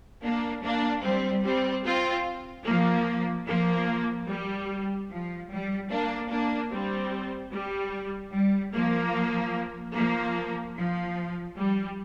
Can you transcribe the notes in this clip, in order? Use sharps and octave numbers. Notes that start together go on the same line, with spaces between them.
A#3 D4
A#3 D4
G3 C4
G3 C4
C4 F4
F3 A#3
F3 A#3
G3
F3
G3
A#3 D4
A#3 D4
G3 C4
G3
G3
F3 A#3
F3 A#3
F3
G3